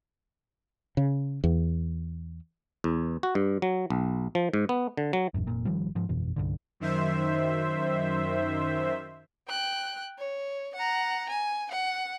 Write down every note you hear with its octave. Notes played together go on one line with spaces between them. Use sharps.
C#3
E2
E2
F#4
G2
F#3
B1
F3
G#2
B3
D3
F#3
D#1 A1 F#2
F1 A#2
G#1 D#3 F3 G3
G#2 F3
G1 F2 B2 E3
C2 G2 D3
F#2 D#3 C5 E5
G5 F#6
C#5
F#5 A#5
G#5
F#5